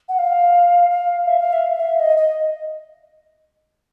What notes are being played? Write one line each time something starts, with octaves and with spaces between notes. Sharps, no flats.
F#5
F5
F5
E5
F5
E5
F5
E5
D#5
D#5